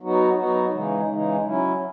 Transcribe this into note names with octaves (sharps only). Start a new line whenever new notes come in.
F#3 B3 D#4 F#4
F#3 B3 D#4 F#4
C#3 E3 G#3 D#4
C#3 E3 G#3 D#4
F#3 C#4 E4